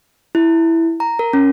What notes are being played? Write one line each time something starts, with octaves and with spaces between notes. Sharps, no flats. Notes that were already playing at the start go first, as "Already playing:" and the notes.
E4
A#5
A#4
C#4